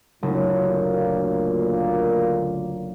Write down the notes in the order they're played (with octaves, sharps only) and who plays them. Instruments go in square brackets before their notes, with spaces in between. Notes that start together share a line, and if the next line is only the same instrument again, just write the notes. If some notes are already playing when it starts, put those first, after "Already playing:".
[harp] F#1 [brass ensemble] D2 A#2 A#3